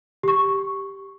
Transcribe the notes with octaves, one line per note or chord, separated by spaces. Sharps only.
G4 C#6